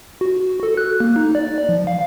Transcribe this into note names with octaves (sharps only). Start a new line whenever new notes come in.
F#4
A4
F#6
A#3
D#4
D5
F3
F5